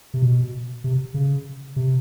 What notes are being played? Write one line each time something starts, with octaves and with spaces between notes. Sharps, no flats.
C3
B2
C3
C#3
C3